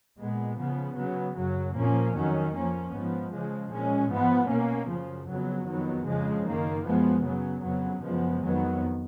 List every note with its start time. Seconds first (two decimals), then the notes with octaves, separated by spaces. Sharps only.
0.19 A#2 G#3 B3
0.58 C#3 F3 B3
0.96 C#3 F#3 B3
1.36 F#2 C#3 F#3
1.76 A#2 F3 A#3 C#4
2.15 F2 D#3 F#3 C#4
2.54 F2 F3 A#3 C#4
2.93 G#2 F3 B3
3.32 C#3 F3 G#3
3.72 A#2 G#3 C#4
4.10 G#2 F3 B3
4.49 B2 A#3 C#4
4.89 F#2 C#3 F3
5.28 F2 C#3 F#3 B3
5.67 F2 D#3 F#3 B3
6.06 F2 C#3 F3 G#3
6.46 F#2 D#3 A#3
6.85 F#2 F3 G#3 B3
7.24 C#3 F#3 B3
7.63 F2 C#3 F#3 B3
8.02 F#2 C#3 F3 G#3 B3
8.42 F2 D#3 F#3 B3